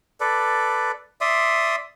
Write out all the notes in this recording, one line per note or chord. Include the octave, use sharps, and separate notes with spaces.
A4 B4 D5
D5 E5 C6 D#6